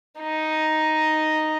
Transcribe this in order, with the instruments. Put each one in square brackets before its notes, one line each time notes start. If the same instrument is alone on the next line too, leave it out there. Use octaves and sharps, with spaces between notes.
[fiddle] D#4